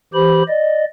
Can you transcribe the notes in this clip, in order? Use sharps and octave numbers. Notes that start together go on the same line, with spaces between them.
E3 G4 C5 B5
D5 D#5